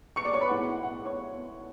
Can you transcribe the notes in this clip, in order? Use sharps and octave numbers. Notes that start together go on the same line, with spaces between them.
C#6 C#7
D5 D6
C#5 C#6
B4 B5
A2 G#3 B3 E4 F#5
F#5
F#5
C#5 C#6